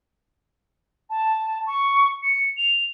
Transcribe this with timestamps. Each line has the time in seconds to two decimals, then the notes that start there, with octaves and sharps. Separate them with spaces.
1.10 A5
1.67 C#6
2.23 C#7
2.57 F7